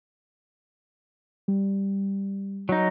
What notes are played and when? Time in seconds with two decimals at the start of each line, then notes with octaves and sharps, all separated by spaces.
1.48 G3
2.69 F#3 D#4